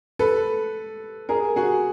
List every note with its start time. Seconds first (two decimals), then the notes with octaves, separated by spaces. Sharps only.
0.19 A4 B4
1.29 G#4 A#4
1.56 F#4 G#4